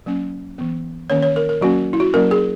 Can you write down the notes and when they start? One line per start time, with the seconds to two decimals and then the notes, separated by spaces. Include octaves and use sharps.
0.06 F#3 A#3 C#4
0.58 E3 B3
1.10 D#3 A#3 C#4 C#5
1.22 C#5
1.36 A#4
1.49 A#4
1.61 F#3 A#3 C#4 F#4
1.93 E4
2.00 F#4
2.14 F#3 A#3 C#4 A#4
2.31 G#4